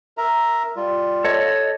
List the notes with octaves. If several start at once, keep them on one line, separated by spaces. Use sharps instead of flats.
A#4 E5 A#5
G3 F4
A4 C#5 D#5